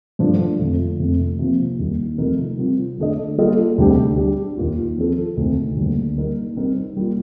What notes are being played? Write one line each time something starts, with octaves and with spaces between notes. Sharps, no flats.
G2 F3 A3 D4
F2 D3 F3 A3
F2 C3 F3 A3 C4
C3 F3 A#3
D#2 D#3 G3
C3 F3 A3 D#4 A#4
C3 G3 C4 F4
D3 A3 D4 A4 D#5
G3 A#3 F4 A4 D#5
D2 C3 G3 D4 G4
G3 D4 G4
D#2 D#3 A#3 F4
F3 C4 F4 A4
D2 C3 D#3
D2 D3 G3 A#3
G3 A#3 D#4 A#4
G3 C4 D#4 A#4
G3 A#3 F4